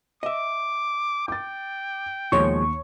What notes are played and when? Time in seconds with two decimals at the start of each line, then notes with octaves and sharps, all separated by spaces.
0.23 D#5 E5 D6
1.28 G5 D6 A6
2.32 D#2 B2 F3 G#3 C#5 C#6